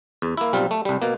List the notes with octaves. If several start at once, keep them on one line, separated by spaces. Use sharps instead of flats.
E2
A#3 E4
B1 G3 C4 F4
A3
C2 G3
B2 A#3